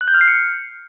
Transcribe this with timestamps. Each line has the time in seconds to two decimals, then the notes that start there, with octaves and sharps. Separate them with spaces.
0.01 F#6
0.08 G6
0.14 F6
0.21 C7
0.28 C#7